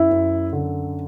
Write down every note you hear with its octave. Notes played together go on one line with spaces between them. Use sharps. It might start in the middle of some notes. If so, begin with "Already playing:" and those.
Already playing: F#2 E4
F#2
D3